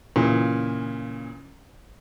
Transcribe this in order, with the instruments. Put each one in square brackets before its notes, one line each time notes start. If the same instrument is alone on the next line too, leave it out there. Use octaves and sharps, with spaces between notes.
[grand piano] A#2 C#3 E3